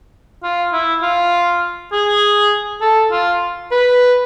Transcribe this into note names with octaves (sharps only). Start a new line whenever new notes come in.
F4
E4
F4
G#4
A4
F4
B4